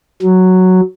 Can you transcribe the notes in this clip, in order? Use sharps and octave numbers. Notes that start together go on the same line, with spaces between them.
F#3